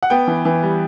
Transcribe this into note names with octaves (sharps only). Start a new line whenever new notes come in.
F#5
B3 G5
E3
E3
G3